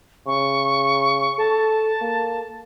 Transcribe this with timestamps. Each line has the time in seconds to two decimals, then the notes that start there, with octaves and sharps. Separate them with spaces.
0.27 C#3 C#6
1.38 A4 A5
2.01 A#3